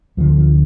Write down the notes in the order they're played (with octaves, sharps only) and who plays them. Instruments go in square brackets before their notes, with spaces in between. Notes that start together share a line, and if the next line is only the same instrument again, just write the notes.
[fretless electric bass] D2 D3 F3
F3